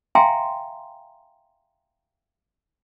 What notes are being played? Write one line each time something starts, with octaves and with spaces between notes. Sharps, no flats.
E5 F5 G5 G#5 A#5 C6